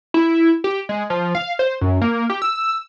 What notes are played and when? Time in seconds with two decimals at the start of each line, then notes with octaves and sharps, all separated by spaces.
0.14 E4
0.64 G4
0.89 G#3
1.10 F3
1.35 F5
1.59 C5
1.81 F#2
2.01 A#3
2.30 G4
2.42 E6